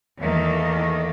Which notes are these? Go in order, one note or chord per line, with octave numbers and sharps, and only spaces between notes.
E2 D#3 A3 A#3